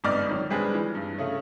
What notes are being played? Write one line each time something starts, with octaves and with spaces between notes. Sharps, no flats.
G1 F2 G#2 D5 D#5 F6
D#3 F#3
G3 G#3 C4 D4 G#4 B4
E3
G2
C#3 A3